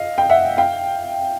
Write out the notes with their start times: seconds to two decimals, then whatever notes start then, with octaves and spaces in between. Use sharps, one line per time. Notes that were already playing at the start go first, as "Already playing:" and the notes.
Already playing: D#5 F5
0.18 G5
0.29 E5 F#5
0.57 F5 G5